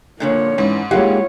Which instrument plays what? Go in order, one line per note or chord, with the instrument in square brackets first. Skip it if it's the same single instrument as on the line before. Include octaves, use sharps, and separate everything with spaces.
[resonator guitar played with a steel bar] A#2 D3 F3 [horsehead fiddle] A#3 C#5
[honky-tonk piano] G#2 [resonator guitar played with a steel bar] E3 [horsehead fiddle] C#4
[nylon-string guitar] G#3 A#3 G4 [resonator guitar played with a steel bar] E4 F5 F#5 [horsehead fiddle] F4 C#5